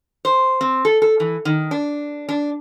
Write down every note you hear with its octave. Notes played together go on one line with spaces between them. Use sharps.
C5
C4
A4
A4
E3
D#3
D4
D4